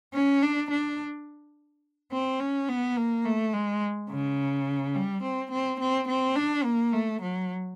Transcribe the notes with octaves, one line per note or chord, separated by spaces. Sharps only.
C#4
D4
D4
C4
C#4
B3
A#3
A3
G#3
C#3
G3
C4
C4
C4
C4
D4
A#3
A3
F#3